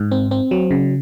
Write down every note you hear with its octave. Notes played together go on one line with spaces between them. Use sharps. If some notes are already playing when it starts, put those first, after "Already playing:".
Already playing: G#2
C4
C4
F#3
C#3